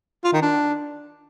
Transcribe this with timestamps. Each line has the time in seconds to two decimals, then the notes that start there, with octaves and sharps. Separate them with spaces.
0.24 F4
0.33 D#3
0.42 D4